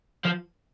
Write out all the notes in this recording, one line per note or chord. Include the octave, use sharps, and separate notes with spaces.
F3